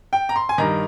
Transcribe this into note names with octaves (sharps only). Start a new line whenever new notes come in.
G5
A#5
C6
G#5
G2 D#3 A#5